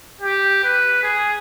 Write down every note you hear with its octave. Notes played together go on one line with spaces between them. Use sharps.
G4
B4
G#4